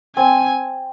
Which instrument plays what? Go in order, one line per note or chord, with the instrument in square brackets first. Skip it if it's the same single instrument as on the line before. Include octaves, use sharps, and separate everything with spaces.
[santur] C4 [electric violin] G#5